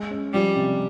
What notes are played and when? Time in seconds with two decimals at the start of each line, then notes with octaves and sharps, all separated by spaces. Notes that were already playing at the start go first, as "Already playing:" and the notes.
Already playing: G#3
0.11 C#4
0.33 F3 G3
0.56 C3